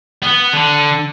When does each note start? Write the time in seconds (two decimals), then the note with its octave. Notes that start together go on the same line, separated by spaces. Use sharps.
0.22 B3
0.53 D3